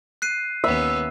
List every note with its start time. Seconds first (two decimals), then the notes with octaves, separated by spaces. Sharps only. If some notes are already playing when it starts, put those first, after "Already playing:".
0.22 F#6 C7 D#7
0.64 D#2 B3 C#4 E5